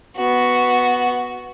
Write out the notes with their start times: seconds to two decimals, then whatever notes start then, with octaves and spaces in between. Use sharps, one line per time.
0.17 B3 F#4